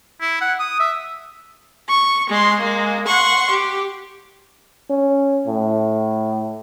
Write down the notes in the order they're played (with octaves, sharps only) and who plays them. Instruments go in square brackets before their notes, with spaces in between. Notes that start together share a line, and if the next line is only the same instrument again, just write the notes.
[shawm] E4
F#5
D#6
E5
[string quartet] C#6
G#3 C6
G#3 A#3
F#5 C6 C#6
G4
[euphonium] C#4
A2